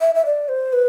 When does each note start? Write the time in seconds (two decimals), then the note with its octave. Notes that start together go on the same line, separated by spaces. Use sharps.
0.01 E5
0.15 E5
0.25 D5
0.48 C5
0.73 B4